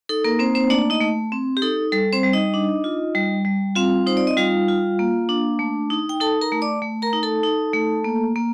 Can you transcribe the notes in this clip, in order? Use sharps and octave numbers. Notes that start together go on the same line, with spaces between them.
D#4 A4
A#3 A#4
A#3 C4 C5
C4 C5
A3 D4 D5
D#4 D#5
A3
C4
G4
D#4 A4
G3 A4
C4 C5
G3
D#4 D#5
D4
F4
G3
G3
C4 F4 F5
D#4 C5
D5
D#5
G3 F4 F5
F4
A#3
D4
A3
D#4
G5
D#4 A4 A5
A#4 A#5
A3
D5 D6
A3
A#4 A#5
D#4
A4 A5
D#4
A3
A#3
A#3